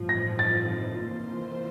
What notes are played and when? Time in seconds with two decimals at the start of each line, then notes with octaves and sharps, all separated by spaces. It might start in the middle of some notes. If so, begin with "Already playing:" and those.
Already playing: A1 G2 F3
0.09 A#6
0.39 A6
0.99 E3 A#3 F4 C5